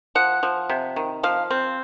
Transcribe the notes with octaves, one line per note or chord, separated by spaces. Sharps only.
F3 F#5
F3
C3
D#3
F3 F5
C4